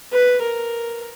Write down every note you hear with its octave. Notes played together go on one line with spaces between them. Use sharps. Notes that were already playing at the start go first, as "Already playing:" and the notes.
B4
A#4